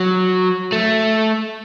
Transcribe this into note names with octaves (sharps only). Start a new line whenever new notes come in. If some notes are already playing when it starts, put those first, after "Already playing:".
Already playing: F#3
A3